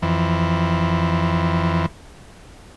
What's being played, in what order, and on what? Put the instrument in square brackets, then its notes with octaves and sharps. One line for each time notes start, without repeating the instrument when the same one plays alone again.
[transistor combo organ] F2 E3